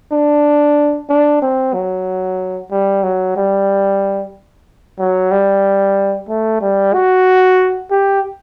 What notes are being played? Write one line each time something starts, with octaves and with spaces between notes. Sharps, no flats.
D4
D4
C4
F#3
G3
F#3
G3
F#3
G3
A3
G3
F#4
G4